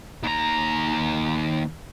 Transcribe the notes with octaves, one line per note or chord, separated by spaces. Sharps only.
D#2 A#5